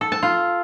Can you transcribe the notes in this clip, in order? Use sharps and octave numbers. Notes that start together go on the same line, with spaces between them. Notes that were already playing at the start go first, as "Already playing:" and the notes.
A4
A5
F4